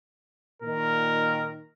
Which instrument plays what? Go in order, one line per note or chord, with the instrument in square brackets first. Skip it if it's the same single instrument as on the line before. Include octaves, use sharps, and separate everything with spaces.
[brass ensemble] A#2 D#3 [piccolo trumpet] A#4